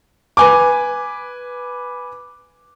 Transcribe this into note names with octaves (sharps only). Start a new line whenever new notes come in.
B4 G#5 D6